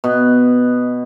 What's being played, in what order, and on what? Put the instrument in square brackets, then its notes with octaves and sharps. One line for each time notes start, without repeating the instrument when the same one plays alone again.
[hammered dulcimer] B2